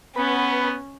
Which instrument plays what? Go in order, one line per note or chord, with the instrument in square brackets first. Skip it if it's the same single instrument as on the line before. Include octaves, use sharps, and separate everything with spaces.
[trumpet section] B3 [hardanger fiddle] C#4 [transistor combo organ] B4